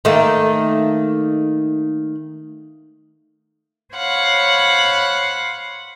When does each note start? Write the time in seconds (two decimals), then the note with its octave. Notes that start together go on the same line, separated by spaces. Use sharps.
0.05 D#3 A3 A#3
3.94 C5 C#5 F5 F#5 B5